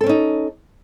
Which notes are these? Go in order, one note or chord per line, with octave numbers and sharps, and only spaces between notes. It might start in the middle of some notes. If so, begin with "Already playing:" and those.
C4 C#4 D#4 A4